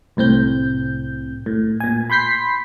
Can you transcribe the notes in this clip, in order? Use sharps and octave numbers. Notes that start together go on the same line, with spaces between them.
C2 A2 C4 G6
A2
A#2 G#5
B5 C6 G6 B6 C7